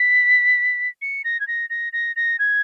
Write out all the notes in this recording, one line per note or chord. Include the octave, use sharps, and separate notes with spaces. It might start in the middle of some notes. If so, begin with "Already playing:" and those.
Already playing: B6
C#7
A#6
G#6
A#6
A#6
A#6
A#6
G#6